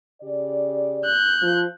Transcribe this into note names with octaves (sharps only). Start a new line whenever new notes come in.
C#3 G4 D5
F#6 G6
F3